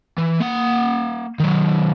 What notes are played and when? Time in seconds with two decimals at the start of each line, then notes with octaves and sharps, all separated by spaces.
0.18 E3
0.40 A#3 F#5
1.40 D#3 F#3